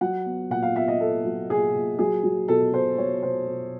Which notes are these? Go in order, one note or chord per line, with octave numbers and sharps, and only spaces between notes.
F#3 F#5
B3
A#2 F#5
F5
B3 E5
D#5
B3 A4
F#3
A#2 G#4
A#2
F#3 G#4
F#3
B2 A4
B2 C5
F#3 C#5
B2 C5
B2